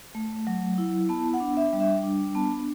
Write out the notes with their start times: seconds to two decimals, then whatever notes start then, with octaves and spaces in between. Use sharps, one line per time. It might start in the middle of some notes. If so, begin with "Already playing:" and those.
0.15 A3
0.47 F#3
0.78 E4
1.09 B3 A5
1.34 F#5
1.40 D4
1.57 E5
1.73 G3
1.80 E5
2.03 D4
2.35 B3 A5